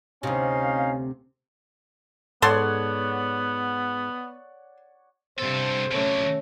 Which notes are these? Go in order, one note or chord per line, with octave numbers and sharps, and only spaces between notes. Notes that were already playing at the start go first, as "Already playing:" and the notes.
D2 C3 C#4 D#4 F5
G#2 B3 A4 C#5 D5 F#5 C6
G2 C3 A4 C5
D3 F#3 A3 C#4